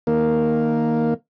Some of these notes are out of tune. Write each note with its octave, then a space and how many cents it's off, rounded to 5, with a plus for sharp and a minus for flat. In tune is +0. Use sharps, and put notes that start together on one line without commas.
D#3 +0 A#3 +0